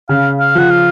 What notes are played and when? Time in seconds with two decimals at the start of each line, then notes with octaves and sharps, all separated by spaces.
0.09 C#3 F5
0.39 F5
0.55 F3 F#5
0.70 F5